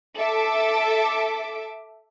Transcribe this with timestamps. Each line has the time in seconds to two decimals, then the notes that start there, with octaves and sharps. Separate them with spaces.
0.18 A4 E5 D6